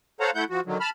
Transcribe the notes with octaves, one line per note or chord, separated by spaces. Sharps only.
A4 C5 C#5 F5 F#5 A#5
A3 E4 F#5 G6
F3 F#4
D3 D#3 F#3
A5 B5 F6